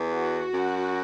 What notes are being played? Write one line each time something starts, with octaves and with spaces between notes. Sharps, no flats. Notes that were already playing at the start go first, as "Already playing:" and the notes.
Already playing: E2
F#4
F#2